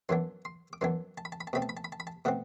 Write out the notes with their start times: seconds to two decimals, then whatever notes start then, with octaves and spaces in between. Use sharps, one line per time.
0.09 F#2 E3 B3 D4 C6
0.45 C6
0.73 D6
0.81 F#2 E3 B3 D4 C6
1.18 A5
1.25 B5
1.32 A5
1.41 B5
1.47 A5
1.53 B2 A3 C4 B5
1.62 A5
1.69 B5
1.77 A5
1.84 B5
1.92 A5
2.00 B5
2.07 A5
2.25 B2 A3 C4 F#5